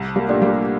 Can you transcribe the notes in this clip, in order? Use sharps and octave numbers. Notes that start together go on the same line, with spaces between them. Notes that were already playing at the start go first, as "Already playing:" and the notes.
Already playing: C2
G3 A#3
A#2 A3 D4 G4
G3 A#3